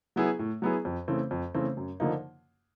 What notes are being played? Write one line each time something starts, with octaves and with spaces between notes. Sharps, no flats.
F#3 B3 E4 G#4
A2
F#3 B3 E4 G#4
F2
C#3 E3 A3 C4
F2
C#3 E3 A3 C4
F#2
D3 F3 A#3 D#4